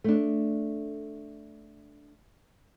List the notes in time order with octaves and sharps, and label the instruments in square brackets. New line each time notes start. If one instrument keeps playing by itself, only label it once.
[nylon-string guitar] A3 D4